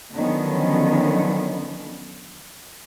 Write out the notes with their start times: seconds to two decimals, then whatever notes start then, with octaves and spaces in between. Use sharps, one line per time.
0.15 D3 D#3 F3 F#3 B3 C#4